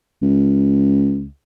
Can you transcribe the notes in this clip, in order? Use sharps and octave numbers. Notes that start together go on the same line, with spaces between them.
C#2